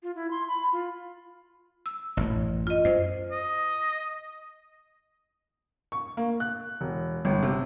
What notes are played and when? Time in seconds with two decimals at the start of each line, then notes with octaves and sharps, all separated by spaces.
0.03 F4
0.15 E4
0.31 C6
0.48 B5
0.73 F4
1.86 E6
2.17 A1 F#2 A2
2.67 F4 D#5
2.85 F#2 C5
3.32 D#5
5.92 C#6
6.17 A#3
6.40 F#6
6.81 E1
7.25 G1
7.43 C3